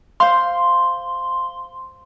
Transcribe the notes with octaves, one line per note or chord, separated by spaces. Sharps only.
C5 F5 C6